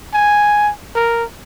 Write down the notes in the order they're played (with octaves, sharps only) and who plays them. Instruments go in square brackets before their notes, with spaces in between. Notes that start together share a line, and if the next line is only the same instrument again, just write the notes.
[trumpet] G#5
A#4